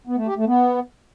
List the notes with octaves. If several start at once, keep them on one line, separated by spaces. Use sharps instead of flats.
B3
A3
G4
A3
B3